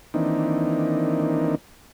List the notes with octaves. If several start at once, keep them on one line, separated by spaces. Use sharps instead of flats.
D#3 E3 A#3 C4 D4 D#4